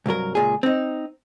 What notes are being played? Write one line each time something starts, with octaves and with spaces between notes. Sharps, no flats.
C2 G2 F#3 A#4
C#2 A#2 G#4
C4 D#4